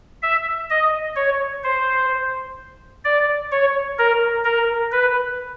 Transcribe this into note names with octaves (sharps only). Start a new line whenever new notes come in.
E5
D#5
C#5
C5
D5
C#5
A#4
A#4
B4